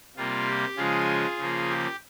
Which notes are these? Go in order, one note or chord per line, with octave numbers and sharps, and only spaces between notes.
C3 G3 A#3 F4
G4
C#3 F3 G#3 F4 G#4
C#3 F3 A#3
G4